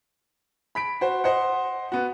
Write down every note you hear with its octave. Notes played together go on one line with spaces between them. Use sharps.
B5 B6 D7
F#4 C5
C5 D#5 F#5
B3 F#4